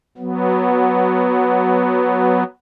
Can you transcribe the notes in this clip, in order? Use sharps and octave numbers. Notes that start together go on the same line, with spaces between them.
F#3 B3